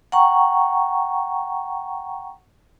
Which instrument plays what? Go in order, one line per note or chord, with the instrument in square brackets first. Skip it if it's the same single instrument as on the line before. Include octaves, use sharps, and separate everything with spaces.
[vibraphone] F#5 G5 A#5 C#6